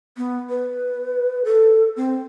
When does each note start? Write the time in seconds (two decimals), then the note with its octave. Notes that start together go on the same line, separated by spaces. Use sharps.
0.17 B3
0.50 B4
1.45 A4
1.97 C4